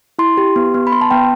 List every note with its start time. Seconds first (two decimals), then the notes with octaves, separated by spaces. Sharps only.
0.19 E4 C6
0.38 G4
0.56 B3
0.74 B3
0.87 B5
0.92 B3 C6
1.01 A5
1.11 B3 G5